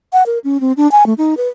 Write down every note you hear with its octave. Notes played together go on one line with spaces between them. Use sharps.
F#5
A#4
C#4
C4
D4
G#5
A3
D#4
B4